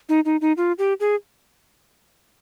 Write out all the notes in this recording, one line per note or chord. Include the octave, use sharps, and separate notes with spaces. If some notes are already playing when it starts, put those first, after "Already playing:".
D#4
D#4
D#4
F4
G4
G#4